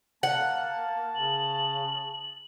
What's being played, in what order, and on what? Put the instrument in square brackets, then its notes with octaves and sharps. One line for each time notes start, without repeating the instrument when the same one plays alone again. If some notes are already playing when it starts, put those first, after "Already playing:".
[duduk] A#3 [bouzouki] F#5 [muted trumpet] A5
[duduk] C#3 [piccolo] F#7